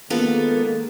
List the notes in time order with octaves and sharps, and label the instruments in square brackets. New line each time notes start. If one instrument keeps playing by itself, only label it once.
[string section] D#3 G#3 A#3 [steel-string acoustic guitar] B3 F4 A4